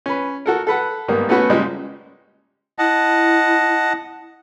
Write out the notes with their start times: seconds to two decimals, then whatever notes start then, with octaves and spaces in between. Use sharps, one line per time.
0.06 C#4 B4
0.46 F#4 A4 A#4
0.67 A4 B4 F#5
1.08 G#2 D#3 G3 A#3 B3
1.29 A3 B3 C#4 F#4 B4
1.49 A#2 C#3 G3 G#3
2.79 E4 D#5 F#5 A5